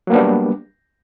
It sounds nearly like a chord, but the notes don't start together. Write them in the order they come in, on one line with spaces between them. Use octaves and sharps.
F#3 A#3 B3 D4 G3